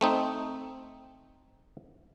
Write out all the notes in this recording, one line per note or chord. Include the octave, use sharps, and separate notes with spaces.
A3 C4 D#4